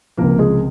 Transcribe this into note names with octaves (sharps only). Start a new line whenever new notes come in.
C#2 C3 F3 A#3 A#4
G#3 G#4